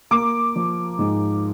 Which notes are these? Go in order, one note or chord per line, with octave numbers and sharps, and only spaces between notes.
A#3 D6
F3
G#2